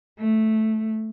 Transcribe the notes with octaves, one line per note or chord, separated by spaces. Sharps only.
A3